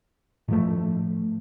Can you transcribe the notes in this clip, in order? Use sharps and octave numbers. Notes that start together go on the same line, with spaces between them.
A2 F3 A3